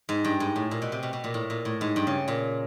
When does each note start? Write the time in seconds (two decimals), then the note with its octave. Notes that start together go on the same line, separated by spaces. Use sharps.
0.09 G#2
0.24 G2
0.40 G#2
0.56 A2
0.71 A#2
0.82 B2
0.92 C3
1.03 B2
1.13 B2
1.24 A#2
1.34 A2
1.50 A#2
1.65 A2
1.81 G#2
1.96 G2
2.07 C#3
2.28 A#2